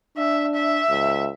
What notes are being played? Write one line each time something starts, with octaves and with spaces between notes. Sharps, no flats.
D4 E5
E5
C#2